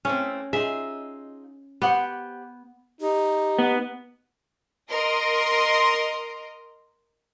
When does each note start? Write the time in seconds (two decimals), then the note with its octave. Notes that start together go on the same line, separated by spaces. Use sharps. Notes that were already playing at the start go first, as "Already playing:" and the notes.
0.05 E3 A3 C4 C#4
0.53 D#4 F4 G#4 E5
1.82 B3 G4 C5 F#5
3.01 D#4 G4
3.58 B3
4.91 A#4 D#5 C6